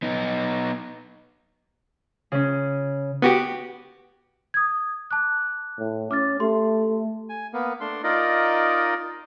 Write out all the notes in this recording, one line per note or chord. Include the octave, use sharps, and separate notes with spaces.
B3 D#4
C#3 C#4
B3 F#4 G4
D#6 G#6
A5 D6 F#6
A2
C#4 D6 F6 A6
A3 G4 C6
G#5
A#3 B3
A3 D4 C6
D#4 F4 A#4 D5 D#5